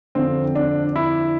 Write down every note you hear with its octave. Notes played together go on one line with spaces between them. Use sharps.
F2 D3 F3 C4
D4
E4